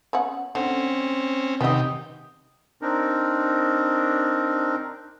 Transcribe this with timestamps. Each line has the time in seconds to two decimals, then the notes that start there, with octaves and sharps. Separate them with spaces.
0.13 B3 C#4 F#5
0.55 D3 C4 C#4
1.61 C3 D#3 B3 G4 D#5
2.82 C4 D4 D#4 A#4